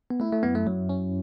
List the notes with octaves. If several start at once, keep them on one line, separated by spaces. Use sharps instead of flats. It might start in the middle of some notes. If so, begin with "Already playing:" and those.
B3
A3 E4
A3
F#2 B3
A3
F#2 F#3
C#4